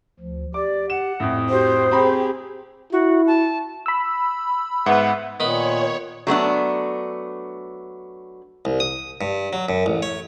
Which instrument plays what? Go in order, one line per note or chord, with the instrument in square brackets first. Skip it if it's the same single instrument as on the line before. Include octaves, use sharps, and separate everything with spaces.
[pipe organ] D2 F3
[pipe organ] G4 [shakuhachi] D5 [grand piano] D6
[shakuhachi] F#5 [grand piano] E7
[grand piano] F2 A2 [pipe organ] D#6
[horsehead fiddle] F#4 G4 [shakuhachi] C5
[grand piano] C4 A#5 B5 [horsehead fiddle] G4 G#4
[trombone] E4 [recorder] F#4
[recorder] A5
[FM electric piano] B5 E6
[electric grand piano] G#2 F#5 [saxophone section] B3 [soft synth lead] E5
[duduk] A#2 [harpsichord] D#3 B3 B5 [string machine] C#5
[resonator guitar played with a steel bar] F#3 A3 B3 D4
[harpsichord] C2
D#6
G2
F#3
F#2
A1
C#5